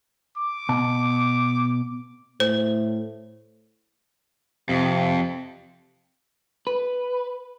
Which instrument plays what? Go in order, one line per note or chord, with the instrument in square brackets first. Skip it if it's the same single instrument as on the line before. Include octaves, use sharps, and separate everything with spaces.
[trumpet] D6
[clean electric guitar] B2 A5
[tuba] A2 [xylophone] C5
[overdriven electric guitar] F2 [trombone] C3
[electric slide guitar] B4